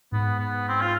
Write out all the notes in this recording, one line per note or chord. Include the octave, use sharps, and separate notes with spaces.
G#2 B3
B3
C4
F4